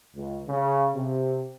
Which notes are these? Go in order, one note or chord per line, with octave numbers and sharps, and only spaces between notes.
C#2
C#3
C3